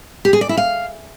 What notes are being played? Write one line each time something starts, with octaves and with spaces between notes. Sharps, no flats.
G4
G#4
D5
E4
F5